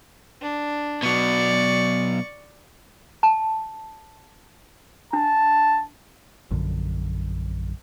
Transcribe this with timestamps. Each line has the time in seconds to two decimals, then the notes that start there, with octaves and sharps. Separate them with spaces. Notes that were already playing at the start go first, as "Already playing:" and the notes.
0.42 D4
1.03 B2 F#3 D5 C#6
3.23 A5
5.13 D4 A5
6.51 A#1 F#2 D3